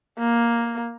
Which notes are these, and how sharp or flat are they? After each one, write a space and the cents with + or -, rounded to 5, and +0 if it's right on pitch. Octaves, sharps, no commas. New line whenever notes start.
A#3 +5